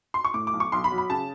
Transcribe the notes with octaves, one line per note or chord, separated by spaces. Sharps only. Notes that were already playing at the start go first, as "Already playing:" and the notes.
C6
C#6
A2 D6
D6
B1
C#6
B1 C6
B5
F#3
B5
C#3 A5